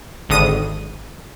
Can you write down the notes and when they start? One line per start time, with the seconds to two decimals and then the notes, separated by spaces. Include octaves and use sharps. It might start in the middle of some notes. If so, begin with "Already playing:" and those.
0.29 G#1 D3 D#6 D#7